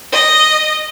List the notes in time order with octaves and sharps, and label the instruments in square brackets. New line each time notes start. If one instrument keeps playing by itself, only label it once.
[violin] D#5